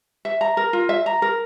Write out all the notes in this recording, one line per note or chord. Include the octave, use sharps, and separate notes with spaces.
E5
A#5
A#4
F4
E5
A#5
A#4